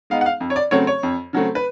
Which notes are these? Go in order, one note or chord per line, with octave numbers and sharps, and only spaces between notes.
G#3 B3 D#4 F5
F#5
F5
F2
C#5
D5
C#3 F#3 A3 C4 C#5
C#5
F2
C#3 F#3 A3 C4
B4